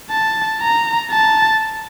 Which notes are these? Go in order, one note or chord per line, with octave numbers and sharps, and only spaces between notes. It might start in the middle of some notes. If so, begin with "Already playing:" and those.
A5
A#5
A5